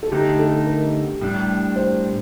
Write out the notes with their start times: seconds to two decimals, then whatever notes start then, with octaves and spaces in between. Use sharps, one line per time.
0.03 A4
0.12 D3 A3 D#4 G4
0.39 A4
0.67 A#4
1.21 A2 G3 D4
1.76 C5